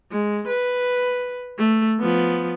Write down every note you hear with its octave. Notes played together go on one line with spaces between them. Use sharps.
G#3
B4
A3
F3 B3